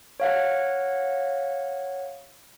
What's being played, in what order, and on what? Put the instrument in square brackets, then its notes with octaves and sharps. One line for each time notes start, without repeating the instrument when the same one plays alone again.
[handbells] C#5 F5 F#5